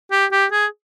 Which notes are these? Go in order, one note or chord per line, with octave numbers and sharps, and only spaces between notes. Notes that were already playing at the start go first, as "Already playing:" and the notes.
G4
G4
G#4